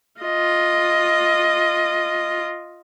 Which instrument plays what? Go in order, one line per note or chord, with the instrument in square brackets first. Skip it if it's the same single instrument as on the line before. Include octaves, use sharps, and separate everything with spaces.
[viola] F4 D#5